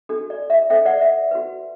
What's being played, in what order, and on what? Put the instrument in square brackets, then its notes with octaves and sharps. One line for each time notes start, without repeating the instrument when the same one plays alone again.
[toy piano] D4 F#4 A4
D5
E5
D4 A4 C5 E5 G5
D5 F#5
E5
F#4 B4